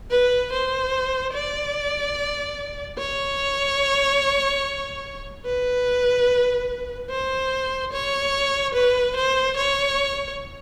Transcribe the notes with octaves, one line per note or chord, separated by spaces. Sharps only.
B4
C5
D5
C#5
B4
C5
C#5
B4
C5
C#5